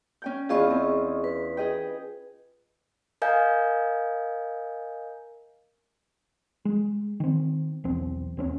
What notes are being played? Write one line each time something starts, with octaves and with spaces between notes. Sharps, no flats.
C#4 G5 G6
E2 F4 G#4 D#5 F5 C#6
C4 C#4
B4
G#4 D#5 G5
A#4 D#5 F5 G#5 G6
G#3
D#3 C4
B1 E2 C4
D#2 C4 C#4